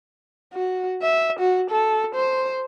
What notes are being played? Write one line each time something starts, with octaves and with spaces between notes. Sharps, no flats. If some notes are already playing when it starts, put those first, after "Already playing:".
F#4
E5
F#4
A4
C5